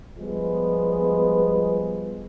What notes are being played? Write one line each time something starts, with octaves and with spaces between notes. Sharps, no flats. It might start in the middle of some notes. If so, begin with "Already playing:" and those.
F3 G3 G#3 B3